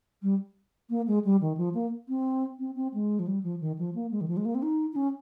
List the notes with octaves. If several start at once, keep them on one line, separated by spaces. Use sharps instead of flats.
G3
A#3
G#3
G3
D#3
F3
A#3
C4
C4
C4
G#3
F3
G3
F3
D#3
F3
A#3
G#3
D#3
F3
G#3
A#3
C4
D#4
D#4
C#4